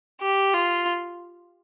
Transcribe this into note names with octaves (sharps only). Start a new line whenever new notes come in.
G4
F4